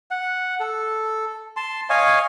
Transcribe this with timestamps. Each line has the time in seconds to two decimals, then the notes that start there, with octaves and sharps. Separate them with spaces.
0.11 F#5
0.60 A4
1.56 A5 C6
1.90 C#5 D#5 F5 G#5